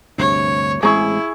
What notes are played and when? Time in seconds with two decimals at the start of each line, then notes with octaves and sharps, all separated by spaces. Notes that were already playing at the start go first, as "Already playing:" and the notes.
0.18 D2 G2 C3 C#5
0.83 A1 G#3 C4 E4 G#4 C#6